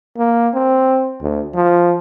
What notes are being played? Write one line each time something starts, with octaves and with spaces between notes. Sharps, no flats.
A#3
C4
D2
F3